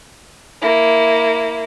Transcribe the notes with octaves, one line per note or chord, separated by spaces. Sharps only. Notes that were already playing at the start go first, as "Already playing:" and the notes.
A#3 E4